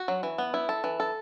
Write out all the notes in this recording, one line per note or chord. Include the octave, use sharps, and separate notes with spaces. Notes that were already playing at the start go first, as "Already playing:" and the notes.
Already playing: F#4
F#3
E3
B3
E4
A4
E3
A4